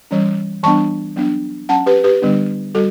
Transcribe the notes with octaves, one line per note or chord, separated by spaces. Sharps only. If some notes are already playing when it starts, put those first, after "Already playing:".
E3 G3 C#4
E3 G3 B3 D4 A5 C#6
F#3 B3 D4
F#3 C#4 F#5 A5
G4 B4
G4 B4
D3 G3 B3 D4
G3 F#4 A4